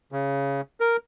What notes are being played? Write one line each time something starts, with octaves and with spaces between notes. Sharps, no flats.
C#3
A#4